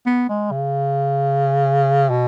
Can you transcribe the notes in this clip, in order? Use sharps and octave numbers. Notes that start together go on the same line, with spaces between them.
B3
G#3
C#3
B2